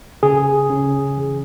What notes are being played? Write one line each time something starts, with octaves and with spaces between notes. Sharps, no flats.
C#3 G#4
C#3
E3